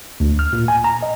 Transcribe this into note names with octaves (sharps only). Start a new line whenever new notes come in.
D2
F6
A#2
G#5
A#5
D#5